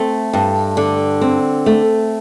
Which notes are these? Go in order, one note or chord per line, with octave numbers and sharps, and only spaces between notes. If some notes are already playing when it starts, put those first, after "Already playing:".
Already playing: A3 C4
G2
D3
C4
A3